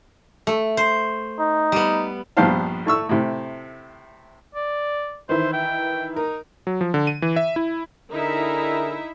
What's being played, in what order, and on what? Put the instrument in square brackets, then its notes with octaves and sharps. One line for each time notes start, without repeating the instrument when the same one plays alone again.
[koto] A3
C5
[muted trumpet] D#4
[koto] G3 B3
[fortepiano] A#1 G2 B3 C5 F5 A5
A2 A3 C#6 E6
A2 C3
[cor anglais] D5
[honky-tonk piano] D#3 E3 E4 [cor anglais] C5
[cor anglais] G5
[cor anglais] D#4 [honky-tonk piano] A#4
[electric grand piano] F#3
F3
D3
D#7
E3
E5
E4
[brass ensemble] D3 G#4 A#4 [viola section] D#4 E4 E5